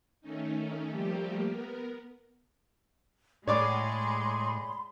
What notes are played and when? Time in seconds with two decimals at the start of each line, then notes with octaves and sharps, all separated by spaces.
0.21 D#3 A3 C#4 D#4
0.90 F3 G3 A3 A#3 G4
1.44 B3 A#4
3.48 A2 G#3 G#4 C#5 D5 B5 C6 D6